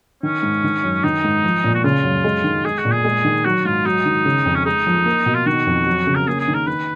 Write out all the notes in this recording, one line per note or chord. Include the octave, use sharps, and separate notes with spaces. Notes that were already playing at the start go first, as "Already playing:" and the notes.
D#3 C#4
G#2
D#3
F#2
D#3 D#4
G#2
F3
A#2
F#4
C#3 F4
F#2
G#3
D#3
G#3 G#4
F#4
A#2
G#4
G#3
D#3
F#3 F#4
G#2 F4
F#3 D#4
D#3
C#3
F2
C#4
G#3 D#4
F3
A#3
B2
F4
D#3 F#4
F2
F#3
C#3
A#4
A#3 G#4
G#4
D#3
A#4
D#3 B4